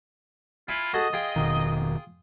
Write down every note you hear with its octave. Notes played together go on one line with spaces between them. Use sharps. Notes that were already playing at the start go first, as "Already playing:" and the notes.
E4 F4 G#5 B5
F#4 G#4 A4 D#5
F4 G#4 G5
F1 B2 D#3